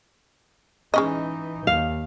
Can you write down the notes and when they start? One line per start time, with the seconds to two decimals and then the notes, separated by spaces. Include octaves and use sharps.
0.94 E3 G#3 C#4 D#4 D#5
1.67 D#2 F5